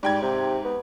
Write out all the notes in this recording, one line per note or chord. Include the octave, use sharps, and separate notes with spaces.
G#2 G3 G5 G#6
C3
B3